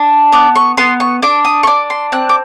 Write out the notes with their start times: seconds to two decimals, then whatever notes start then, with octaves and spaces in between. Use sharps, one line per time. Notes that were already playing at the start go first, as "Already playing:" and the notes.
Already playing: D4
0.32 B3 D6
0.56 C#6
0.77 B3 C6
1.00 C#6
1.22 D4 D6
1.45 D#6
1.63 C#6
1.67 D4 D6
1.90 C6
2.12 C4 F#6
2.29 D6